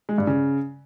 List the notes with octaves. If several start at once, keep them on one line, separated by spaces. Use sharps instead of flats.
G#3
G2
C#3